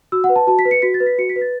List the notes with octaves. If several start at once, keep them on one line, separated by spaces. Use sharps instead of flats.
F#4 E6
F#5
B4
A5
F#4 A5
B6
B4
C#7
F#4 B6
A6
B4
B6
F#4 C#7
B6
B4
A6